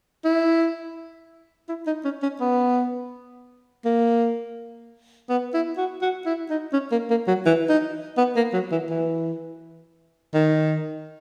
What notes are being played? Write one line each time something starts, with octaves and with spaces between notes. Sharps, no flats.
E4
E4
D#4
C#4
C#4
B3
A#3
B3
E4
F#4
F#4
E4
D#4
C#4
A#3
A#3
F#3
E3
D#4
B3
A#3
F#3
E3
E3
D#3